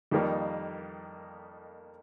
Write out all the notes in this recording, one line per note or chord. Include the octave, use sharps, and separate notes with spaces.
F2 D#3 G3 A#3 D#4